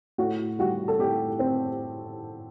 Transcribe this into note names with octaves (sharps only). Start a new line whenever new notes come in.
A2 F#4
G3 F#4
A4
A2 G4
C4